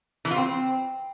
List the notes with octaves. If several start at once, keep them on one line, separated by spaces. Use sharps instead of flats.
E3
F4
C4